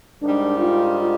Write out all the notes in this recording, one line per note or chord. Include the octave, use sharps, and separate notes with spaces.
G#2 D#3 G3 D4
F4